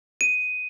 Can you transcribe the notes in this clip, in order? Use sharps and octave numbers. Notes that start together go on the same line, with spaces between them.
D#7